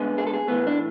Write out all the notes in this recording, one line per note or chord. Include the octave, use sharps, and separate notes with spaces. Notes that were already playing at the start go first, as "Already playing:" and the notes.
Already playing: D2 D3 G#3 B3
G#4
A4
G#4
A2 E3 A3 B3
D4